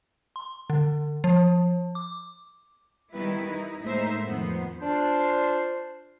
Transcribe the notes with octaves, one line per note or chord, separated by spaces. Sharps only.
C6
D3
F3
D6
D#3 G3 B3 E4 B4
D#4 E4
A2 G#3 A#3 D#4 C5 E5
F2 D#3 B3 C5
D4 F4 C5